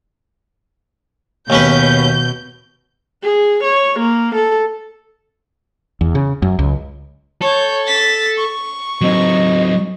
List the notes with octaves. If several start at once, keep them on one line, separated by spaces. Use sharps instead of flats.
D#2 B2 C#4 B4 G6
G#4
C#5
A#3
A4
E2
C#3
F#2
C#2
A4 C#5 G6
A6 B6
C#6
F#3 C4 D#4 D#5